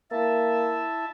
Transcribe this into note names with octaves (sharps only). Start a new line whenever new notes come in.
A#3 E4 E5 A5